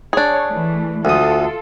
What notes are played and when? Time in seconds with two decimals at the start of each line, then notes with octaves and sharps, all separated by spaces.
0.13 D4 G#4 C#5
0.47 E3 A3
1.05 D2 F4 A4 D#6